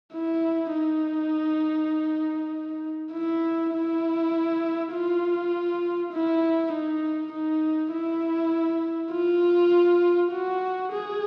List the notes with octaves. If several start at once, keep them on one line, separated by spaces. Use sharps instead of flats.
E4
D#4
E4
E4
F4
E4
D#4
D#4
E4
F4
F#4
G#4